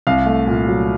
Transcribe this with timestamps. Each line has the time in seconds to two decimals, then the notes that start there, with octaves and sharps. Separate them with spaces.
0.07 C2 F5
0.26 A3
0.47 A#2
0.67 F#3